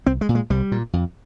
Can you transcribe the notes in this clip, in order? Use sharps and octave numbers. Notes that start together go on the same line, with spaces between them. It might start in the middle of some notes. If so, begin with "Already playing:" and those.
C2 C4
G#3
A#2
G#3
C2 G3
A#2
F2